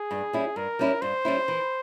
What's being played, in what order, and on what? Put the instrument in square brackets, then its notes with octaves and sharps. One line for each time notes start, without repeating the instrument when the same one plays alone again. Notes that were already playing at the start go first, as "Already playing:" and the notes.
Already playing: [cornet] G#4
[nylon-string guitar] G2
G3 C#4 E4
[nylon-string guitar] G2 [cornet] A#4
[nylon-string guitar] G3 C#4 E4
[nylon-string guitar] G2 [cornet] C5
[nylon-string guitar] G3 C#4 E4
E3